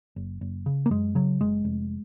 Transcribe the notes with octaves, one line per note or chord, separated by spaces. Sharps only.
F#1
F#1
C#3
A#3
F#2 G#3
C#3 F#3
F#1 G#3
F1